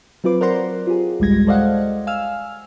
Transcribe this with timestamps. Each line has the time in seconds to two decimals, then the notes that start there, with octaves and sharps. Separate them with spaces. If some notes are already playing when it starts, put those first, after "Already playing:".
0.24 F#3 C4 F4 B4 D6
0.41 A#4 C5 D5 F#5 A#5 C6
0.87 F4 G4 G#4
1.20 A1 D2 G3 G#3 G#6 A#6
1.47 A4 C5 D5 D#5 F5 F#5
2.07 F5 G#5 E6 F6